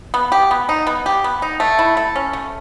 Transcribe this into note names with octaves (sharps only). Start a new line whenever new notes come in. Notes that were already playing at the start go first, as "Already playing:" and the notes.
B3
G4
B3
D#4
B3
G4
B3
D#4
A3
E4
A4
C#4
A3